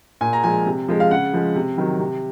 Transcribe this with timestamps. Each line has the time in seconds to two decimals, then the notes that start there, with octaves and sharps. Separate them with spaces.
0.21 A#2 G#5
0.33 A#5
0.43 F3 G#3 G#5
0.66 C3
0.88 F3 G#3
1.00 F5
1.11 C#3 F#5
1.33 F3 G#3
1.55 C3
1.77 D#3 F#3
1.99 C3